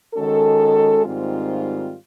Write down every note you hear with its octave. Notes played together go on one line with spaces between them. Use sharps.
D#3 G#3 C#4 F#4 A4
G#2 D#3 G3 C4 F4